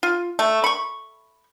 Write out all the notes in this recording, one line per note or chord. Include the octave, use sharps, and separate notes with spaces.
F4
A3
B5 C#6